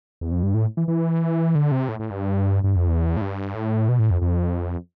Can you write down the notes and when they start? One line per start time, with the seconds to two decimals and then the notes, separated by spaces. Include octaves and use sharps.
0.21 E2
0.32 F2
0.43 G2
0.54 A2
0.77 E3
0.88 E3
1.55 D3
1.72 C3
1.89 A2
2.00 A2
2.11 G2
2.64 G2
2.76 F2
2.88 E2
3.17 A2
3.21 G2
3.55 A2
3.89 B2
3.99 A2
4.11 F2
4.22 F2